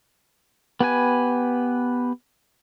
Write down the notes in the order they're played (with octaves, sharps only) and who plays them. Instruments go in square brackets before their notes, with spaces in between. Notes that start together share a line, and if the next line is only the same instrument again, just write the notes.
[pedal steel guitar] B3 G4 B4 G#5